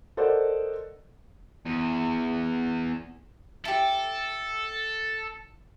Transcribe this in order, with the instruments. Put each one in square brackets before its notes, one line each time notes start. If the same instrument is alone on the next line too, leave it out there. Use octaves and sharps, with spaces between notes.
[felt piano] A4 A#4 C5 D5 D#5 F#5
[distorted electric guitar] E2
[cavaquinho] E4 G4 [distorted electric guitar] A4